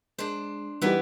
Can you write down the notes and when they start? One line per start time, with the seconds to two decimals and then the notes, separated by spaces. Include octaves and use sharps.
0.18 G#3 D4 C5
0.82 E3 G3 B3 D#4 G4